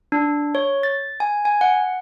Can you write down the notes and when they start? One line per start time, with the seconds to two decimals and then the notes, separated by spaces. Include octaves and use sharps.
0.12 D4
0.55 C#5
0.83 A6
1.20 G#5
1.45 G#5
1.61 F#5